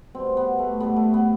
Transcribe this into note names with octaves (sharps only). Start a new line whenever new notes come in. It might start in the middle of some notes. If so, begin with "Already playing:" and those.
B2 G3 C4
B3
A3
A2 G3 B3
A3
B3